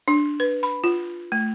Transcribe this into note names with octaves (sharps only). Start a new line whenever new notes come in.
D4
B4
B5
F4
A3